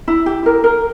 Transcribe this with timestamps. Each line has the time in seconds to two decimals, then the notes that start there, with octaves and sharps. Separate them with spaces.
0.08 E4
0.26 G4
0.46 A#4
0.64 A#4